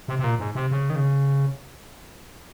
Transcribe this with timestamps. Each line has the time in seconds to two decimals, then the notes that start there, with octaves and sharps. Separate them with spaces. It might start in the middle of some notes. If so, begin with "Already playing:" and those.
0.08 C3
0.19 C3
0.24 A#2
0.39 G#2
0.55 C3
0.71 C#3
0.90 D#3
0.96 C#3